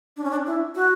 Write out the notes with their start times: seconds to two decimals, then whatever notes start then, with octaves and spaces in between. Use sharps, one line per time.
0.17 D4
0.24 C#4
0.31 D4
0.46 E4
0.75 F#4